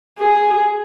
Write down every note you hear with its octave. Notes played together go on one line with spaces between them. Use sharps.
G#4